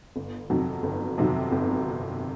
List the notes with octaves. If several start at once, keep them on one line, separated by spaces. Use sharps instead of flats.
G1
F2 C3 D#3 F#3
G1
F2 C3 D#3 F#3
G1